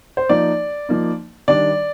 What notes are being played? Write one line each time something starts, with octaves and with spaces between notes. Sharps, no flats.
C5
F3 A#3 D#4 D5
F3 A#3 D#4
D#3 G3 D4 D5